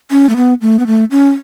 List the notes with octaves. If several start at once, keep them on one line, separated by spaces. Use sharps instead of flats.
C#4
A3
B3
A3
B3
A3
C#4